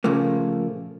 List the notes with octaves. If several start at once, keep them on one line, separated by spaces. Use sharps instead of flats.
A#2 C#3 F3 A3 A#3